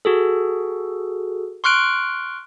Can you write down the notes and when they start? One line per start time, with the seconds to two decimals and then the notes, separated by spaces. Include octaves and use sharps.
0.05 F#4 G#4 A4
1.64 C6 C#6 F6 F#6 D7